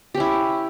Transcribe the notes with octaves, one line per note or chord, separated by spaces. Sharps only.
C#4 E4 G4